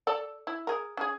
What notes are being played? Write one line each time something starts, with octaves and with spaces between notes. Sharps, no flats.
A4 D5
E4
G#4 A#4
C#4 G#4